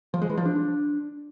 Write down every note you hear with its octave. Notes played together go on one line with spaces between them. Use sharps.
F3
G#3
E3
F3
D4